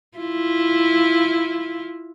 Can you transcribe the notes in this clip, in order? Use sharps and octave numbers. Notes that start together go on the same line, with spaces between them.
E4 F4